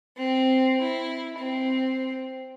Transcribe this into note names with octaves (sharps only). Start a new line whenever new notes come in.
C4
E4
C4